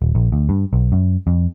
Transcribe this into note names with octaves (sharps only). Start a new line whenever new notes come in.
D#1
A#1
D2
G2
B1
F#2
F2